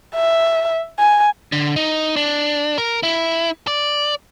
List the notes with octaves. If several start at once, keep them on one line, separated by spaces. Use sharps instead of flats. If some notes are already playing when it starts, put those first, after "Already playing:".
E5
G#5
D3
D#4
D4
A#4
E4
D5